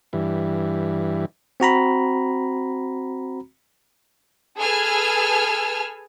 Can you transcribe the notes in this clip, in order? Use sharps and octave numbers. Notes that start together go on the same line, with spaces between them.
G2 E3
C4 F#4 A#5 B5
G#4 A4 B4 G#5 E6 F6